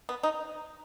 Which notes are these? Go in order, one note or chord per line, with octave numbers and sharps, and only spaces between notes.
B3
D#4